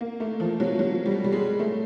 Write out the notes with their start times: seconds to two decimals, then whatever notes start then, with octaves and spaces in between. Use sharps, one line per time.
0.01 A#3
0.20 A3
0.40 F3
0.60 F#3
0.79 F#3
1.06 G3
1.24 G3
1.32 G#3
1.59 A3